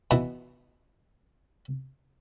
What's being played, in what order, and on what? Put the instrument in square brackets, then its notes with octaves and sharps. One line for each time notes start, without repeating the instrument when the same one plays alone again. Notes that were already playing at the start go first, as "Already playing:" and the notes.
[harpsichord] B2 E3 B3